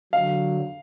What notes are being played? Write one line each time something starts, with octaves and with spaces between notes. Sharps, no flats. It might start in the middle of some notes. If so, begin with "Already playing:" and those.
D3 F#3 F5